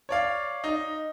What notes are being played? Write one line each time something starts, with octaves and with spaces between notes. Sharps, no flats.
C#5 D5 F5
D#4